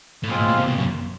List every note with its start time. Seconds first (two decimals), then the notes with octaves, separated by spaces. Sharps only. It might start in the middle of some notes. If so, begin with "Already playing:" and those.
0.23 A2
0.28 A#2 G#3 C4 F4
0.38 A2
0.48 A#2
0.57 C3
0.67 B2
0.77 F#2